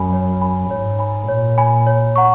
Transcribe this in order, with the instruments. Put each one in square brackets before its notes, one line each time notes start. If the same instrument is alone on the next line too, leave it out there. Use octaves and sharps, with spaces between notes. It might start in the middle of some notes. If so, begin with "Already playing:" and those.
Already playing: [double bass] F#2 [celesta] G#5 B5
[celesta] C#5
G#5 B5
[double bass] G#2 [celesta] C#5
[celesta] G#5 B5
[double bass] A#2 [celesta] C#5
[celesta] G#5 B5
C#5
F#5 A#5 C#6